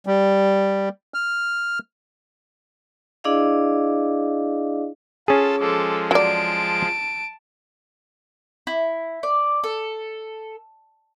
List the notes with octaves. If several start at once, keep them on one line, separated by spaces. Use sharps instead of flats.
G3
F6
D4 E4 G#4 D5 D#5 F5
C#4 F4 G#4 A4 A5
F3 G#3 A4 D6
F#3 D5 A5 D7
E4
D5
A4